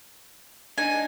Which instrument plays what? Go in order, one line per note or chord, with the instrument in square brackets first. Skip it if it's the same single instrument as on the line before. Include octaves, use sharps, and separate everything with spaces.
[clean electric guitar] D4 D#4 [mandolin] G#5